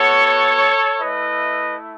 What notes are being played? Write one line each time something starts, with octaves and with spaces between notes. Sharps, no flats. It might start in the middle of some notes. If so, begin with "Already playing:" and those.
Already playing: B3 F#4 A4 C#5
A3 E4 B4 D#5